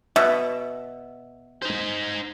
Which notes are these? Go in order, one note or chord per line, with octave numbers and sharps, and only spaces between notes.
B2 E5
D#4 C5